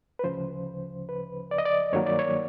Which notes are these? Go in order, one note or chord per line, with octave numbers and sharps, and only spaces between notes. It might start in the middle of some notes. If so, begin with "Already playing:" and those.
B4
D2 C#3 F3 C5
B4
D5
D#5
D5
G2 D#3 F#3 A#3 C#5
D5
C#5